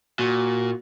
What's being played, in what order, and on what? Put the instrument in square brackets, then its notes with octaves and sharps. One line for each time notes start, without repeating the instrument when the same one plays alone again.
[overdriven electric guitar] A#2 [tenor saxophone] F#4